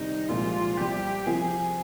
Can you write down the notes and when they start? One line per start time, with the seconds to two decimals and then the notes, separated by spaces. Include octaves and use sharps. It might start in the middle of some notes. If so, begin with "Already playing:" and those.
Already playing: C3 D#3 G3 D4 D#4
0.29 C2 A#2 F3 G#3 F4
0.78 C2 C3 G3 G4
1.26 C3 F3 C4 F4 G#4